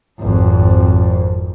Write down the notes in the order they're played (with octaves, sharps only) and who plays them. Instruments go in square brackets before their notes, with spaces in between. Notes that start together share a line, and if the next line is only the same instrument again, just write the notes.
[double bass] G#1 F2